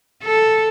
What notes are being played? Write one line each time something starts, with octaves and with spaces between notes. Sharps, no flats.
A4